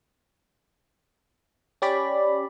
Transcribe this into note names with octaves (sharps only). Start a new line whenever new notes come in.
C#4 G4 D5 B5